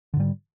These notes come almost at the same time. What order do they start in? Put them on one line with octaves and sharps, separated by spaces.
D3 G#2 G3